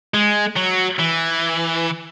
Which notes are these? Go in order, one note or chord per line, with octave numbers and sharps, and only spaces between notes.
G#3
F#3
E3